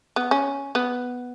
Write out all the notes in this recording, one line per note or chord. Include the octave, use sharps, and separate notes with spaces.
B3
C#4
B3